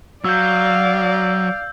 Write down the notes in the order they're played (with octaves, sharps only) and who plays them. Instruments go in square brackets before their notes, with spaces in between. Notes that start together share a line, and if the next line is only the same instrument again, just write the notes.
[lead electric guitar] F#3 [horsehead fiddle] D5 F5 [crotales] E6 G6